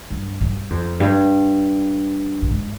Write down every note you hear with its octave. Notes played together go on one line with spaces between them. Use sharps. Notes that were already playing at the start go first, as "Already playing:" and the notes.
G2
G2
F2
G2
G2
G#2